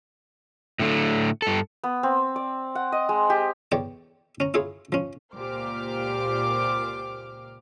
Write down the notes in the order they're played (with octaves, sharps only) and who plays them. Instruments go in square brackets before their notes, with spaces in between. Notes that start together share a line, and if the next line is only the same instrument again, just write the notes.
[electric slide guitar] A2 D3 A3
G2 A4
[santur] B3
C4
D5
F#5
D#5
G#3
G4
[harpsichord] E2 C#5 D5 G5
C#4 A#5
E4 F4 G#4 C#5
F3 C#4
[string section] C#2 A#2 G4 C5 D6 F6